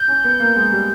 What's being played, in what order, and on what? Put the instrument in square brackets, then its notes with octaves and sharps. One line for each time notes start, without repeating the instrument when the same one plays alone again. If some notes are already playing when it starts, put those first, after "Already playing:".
Already playing: [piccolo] G6
[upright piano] C#4
B3
A#3
G#3
G3